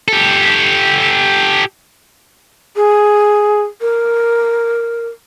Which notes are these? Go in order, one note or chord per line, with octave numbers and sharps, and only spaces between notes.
G4 A4
G#4
A#4